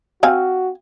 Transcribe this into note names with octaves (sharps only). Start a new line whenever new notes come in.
C4 F#4 F5 G#5